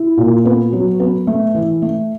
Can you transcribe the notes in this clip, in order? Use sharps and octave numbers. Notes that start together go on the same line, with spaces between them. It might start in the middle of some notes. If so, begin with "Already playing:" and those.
Already playing: E4
A#2
B3
F#3
B3
A3
E3
A3